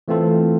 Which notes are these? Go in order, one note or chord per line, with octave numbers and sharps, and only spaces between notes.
E3 A3 C4 F4 A4